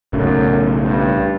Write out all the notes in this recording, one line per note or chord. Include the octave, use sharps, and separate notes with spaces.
B1 F#2 A2 C#3
G2